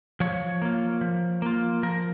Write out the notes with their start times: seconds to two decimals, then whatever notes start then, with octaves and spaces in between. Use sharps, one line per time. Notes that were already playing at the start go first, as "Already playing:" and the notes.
0.20 F3 C#5
0.62 A#3 F4
1.01 F3
1.42 A#3 F4
1.83 F3 A#4